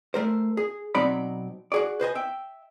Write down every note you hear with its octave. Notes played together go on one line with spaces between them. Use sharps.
A3 A#4 C5
G#4
B2 F#3 C4 D#4 D5 B5
F#4 G#4 D5
B4 C5 D#5 G#5
E5 G5